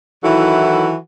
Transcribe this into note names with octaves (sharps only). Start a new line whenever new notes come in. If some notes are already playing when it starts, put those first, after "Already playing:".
D#3 E3 F#3 E4 F#4 A4